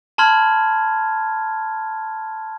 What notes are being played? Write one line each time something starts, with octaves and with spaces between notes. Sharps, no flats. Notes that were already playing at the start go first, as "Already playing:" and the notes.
A5 B5 C6 F6 G#6